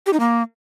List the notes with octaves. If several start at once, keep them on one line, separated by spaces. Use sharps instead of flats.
G4
D#4
A#3